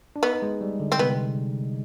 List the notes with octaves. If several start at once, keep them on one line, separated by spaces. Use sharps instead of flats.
D4
B3 D#4
G#3
G3
D3
C4
C3 B3